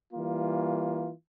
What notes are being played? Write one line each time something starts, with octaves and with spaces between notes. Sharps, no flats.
E3 G3 A#3 F4